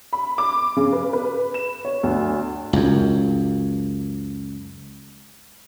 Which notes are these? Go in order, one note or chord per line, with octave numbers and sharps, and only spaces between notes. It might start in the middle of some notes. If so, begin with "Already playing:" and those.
B5
D6
C#3
B4
B4
E7
C#5
D2
C#2 F#2